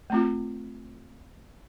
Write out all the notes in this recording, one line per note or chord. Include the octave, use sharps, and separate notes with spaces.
A3 C4 F4